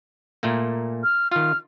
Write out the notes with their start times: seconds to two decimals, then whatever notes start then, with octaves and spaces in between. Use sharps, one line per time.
0.43 A#2 A3 A#3
1.04 F6
1.31 D#3 F4 F6